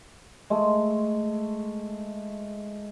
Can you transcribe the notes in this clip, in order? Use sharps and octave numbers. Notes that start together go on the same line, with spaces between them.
G#3 A3